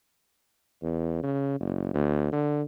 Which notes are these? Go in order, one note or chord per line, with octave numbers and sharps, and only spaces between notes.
E2
C#3
F#1
D2
D3